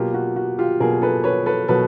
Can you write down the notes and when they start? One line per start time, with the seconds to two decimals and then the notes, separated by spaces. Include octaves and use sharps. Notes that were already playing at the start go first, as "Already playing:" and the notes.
Already playing: B2 F#3 A#3 F4 G4
0.14 F#4
0.36 F#4
0.59 F4 G4
0.80 B2 F#3 A#3 G#4 A#4
1.02 A4 B4
1.24 B4 C#5
1.46 A4 B4
1.68 B2 F#3 A4 B4